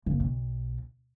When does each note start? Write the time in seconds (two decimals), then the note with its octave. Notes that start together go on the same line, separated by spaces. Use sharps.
0.06 F#1
0.20 B1